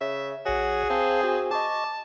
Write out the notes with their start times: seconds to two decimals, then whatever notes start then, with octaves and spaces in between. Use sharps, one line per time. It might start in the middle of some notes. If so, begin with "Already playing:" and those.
0.01 C#3 E5
0.46 A#1 F#4 G#4 C#5
0.90 C4 C5 F5 A5
1.24 F#4 C5
1.51 D#5 A5 C#6 D6